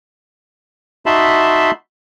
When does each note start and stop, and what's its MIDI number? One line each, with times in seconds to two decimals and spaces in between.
1.06 1.71 63
1.06 1.71 66
1.06 1.71 76
1.06 1.71 81
1.06 1.71 83
1.06 1.71 84